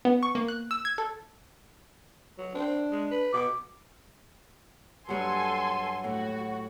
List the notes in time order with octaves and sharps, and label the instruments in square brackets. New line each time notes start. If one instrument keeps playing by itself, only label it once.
[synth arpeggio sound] B3
C#6
A#3
F#6
E6
G#6
A4
[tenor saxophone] F#3
[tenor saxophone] C4 [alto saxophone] D4
[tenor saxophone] G#3
B4
[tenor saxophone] B2 [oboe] D6
[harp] G2 F#3 [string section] A4 G#5 C6
[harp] A2 [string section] F#4